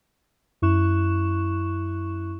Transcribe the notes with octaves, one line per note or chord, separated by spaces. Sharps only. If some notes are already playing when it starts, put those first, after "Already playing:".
F#2 E4 C#6 F#6 E7